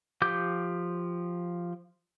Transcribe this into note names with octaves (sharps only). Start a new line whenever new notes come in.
F3 G4 D6 G6